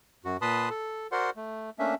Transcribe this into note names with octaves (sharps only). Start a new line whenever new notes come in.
F#2 F#4
A#2 B4 A5 B5 C6 D#6
A4
F#4 A#4 C5 D5 F#5 C6
A3
A3 A#3 C#4 D4 E5